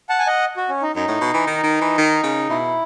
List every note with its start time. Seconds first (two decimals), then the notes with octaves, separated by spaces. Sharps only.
0.09 F#5 A5
0.19 G#5
0.27 D#5 F#5
0.57 F#4
0.69 C#4
0.82 D#4
0.96 F#2 D#4
1.08 A2
1.21 B2
1.34 E3
1.47 D#3
1.63 D#3
1.81 E3
1.98 D#3
2.23 C#3
2.49 B2 E4